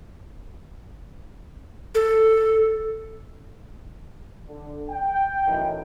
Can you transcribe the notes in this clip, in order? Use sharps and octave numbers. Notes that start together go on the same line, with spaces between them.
A4
D3
G5
F#2 A2 E3 F#3 D#4 G5